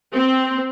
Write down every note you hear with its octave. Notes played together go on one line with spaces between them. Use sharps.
C4